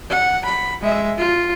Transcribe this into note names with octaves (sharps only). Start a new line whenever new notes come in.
F#5
B5
G#3 E5
F4